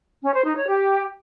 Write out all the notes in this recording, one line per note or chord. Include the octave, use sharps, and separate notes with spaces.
C#4
C5
D#4
C#5
G4